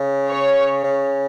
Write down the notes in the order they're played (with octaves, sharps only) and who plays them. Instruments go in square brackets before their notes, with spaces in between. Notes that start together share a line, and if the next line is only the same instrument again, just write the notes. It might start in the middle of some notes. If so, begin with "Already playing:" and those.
Already playing: [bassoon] C#3
[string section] C#5
[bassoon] C#3